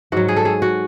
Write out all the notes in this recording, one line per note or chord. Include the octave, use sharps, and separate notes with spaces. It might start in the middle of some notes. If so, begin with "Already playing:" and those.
G#2 F#3 F#4
G#4
A4
G#4
F#4